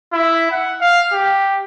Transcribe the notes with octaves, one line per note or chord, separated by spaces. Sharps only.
E4
F#5
F5
G4